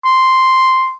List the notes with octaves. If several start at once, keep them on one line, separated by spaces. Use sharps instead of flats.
C6